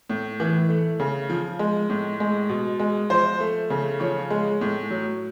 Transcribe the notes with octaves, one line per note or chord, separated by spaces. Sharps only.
A2
E3
A3
C#3
F3
G#3
A2
G#3
B2
G#3
F3 C5
A3
C#3
F3 C#5
G#3
A2
F#3